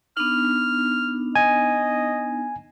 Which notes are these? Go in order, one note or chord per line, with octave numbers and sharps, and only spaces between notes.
B3 D4 D#4 F6
D#5 G#5